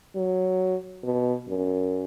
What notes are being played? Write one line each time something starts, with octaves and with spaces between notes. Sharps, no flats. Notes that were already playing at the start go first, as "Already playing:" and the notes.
F#3
B2
F#2